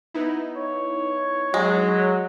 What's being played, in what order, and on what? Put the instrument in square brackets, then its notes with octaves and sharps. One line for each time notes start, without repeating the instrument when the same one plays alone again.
[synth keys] B3 D#4 E4
[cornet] C#5
[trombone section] F#3 [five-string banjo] G#3